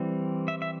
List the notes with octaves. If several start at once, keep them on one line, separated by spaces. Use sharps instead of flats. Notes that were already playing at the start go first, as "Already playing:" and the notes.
Already playing: E3 G3 C4
E5
E5